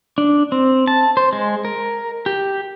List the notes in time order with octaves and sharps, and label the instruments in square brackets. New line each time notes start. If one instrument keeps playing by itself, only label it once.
[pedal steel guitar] D4
C4
A5
C5
G#3
A#4
G4